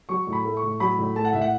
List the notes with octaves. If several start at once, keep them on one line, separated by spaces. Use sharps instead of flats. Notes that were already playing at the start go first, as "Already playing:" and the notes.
F#3 C#6
A2
B5
A3
C#6
A2
F#3 B5
A2
A3 A5
F#5
A2 E5
F#5